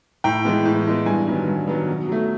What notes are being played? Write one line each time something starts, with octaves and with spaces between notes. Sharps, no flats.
A2 G5
E3 G#3 B3
A2
E3 G#3 B3
G2 G#5
D#3 F#3 B3
G2
D#3 F#3 B3
B2
F#3 A3